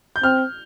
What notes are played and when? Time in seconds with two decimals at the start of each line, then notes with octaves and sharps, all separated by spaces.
0.16 G6
0.23 C4 F6